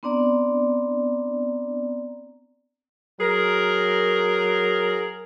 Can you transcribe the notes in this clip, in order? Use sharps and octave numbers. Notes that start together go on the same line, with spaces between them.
B3 C4 D4 D5 A#5
F#3 G#4 A#4